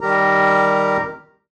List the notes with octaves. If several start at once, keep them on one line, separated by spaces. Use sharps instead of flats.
D#3 G3 G4 A#4 A#5